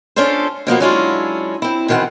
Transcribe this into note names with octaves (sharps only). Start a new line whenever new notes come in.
C#4 D4 F4 A4 C5
B2 F3 A#3 B3
F#3 G#3 C#4 D4 E4 F4
C4 E4
B2 D#3 E3 C4 F#5